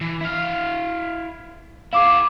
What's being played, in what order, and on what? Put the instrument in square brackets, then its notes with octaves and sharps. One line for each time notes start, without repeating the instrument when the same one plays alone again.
[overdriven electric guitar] E3
E4 F5
[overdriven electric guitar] E4 G#4 [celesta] F5 D6